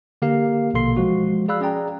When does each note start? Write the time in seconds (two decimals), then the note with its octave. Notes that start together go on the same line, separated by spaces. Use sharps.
0.22 D3 A#3 G4 A#4 F5
0.74 A#1 B2 A#3 A4 C6 C7
0.97 F3 G#3 F#4
1.48 G#4 D5 F5 B5 E6 F#6
1.61 C#4 G#4 D5 G5 A#5